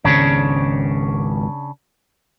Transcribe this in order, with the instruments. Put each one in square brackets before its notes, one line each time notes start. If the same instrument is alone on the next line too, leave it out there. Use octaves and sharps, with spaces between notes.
[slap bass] G#1 C#2 G#2 [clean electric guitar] C#3 C#4 D4